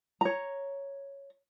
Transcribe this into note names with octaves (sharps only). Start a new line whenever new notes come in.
C#5 A#5